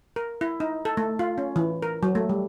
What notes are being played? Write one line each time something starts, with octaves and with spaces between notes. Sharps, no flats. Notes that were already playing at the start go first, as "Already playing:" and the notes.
A#4
E4
D#4
A4
A3
F4
C#4
E3
A#4
F#3
A3
G3